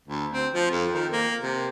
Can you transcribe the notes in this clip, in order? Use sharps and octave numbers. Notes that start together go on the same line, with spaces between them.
D2
C4
F3
F2
D#3
A#3
C3